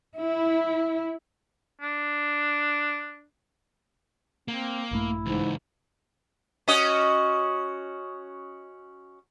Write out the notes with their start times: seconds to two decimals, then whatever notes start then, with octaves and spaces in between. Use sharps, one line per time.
0.20 E4
1.81 D4
4.48 A#3 C4
4.91 A#1 G2 A3 E4
5.26 C#2 G#2 E3
6.68 C#4 F#4 D#5